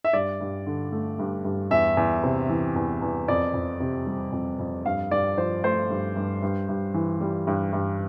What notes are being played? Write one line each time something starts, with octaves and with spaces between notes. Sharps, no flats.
E5
G2 D5
G2
D3
A3
G2
G2
E2 E5
E2
C3
E3
E2
E2
F2 D5
F2
C3
G3
F2
F2
G2 F5
G2 D5
F3 C5
A3 C5
G2
G2
G2
G2
E3
G3
G2
G2